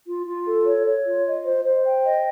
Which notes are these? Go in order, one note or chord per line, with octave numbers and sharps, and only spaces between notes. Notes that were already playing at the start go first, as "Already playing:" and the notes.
F4
F4
A4
C#5
C#5
F4
D#5
C5
C5
G5
D#5